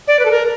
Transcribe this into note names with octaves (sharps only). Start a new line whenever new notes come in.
D5
B4
A4
A#4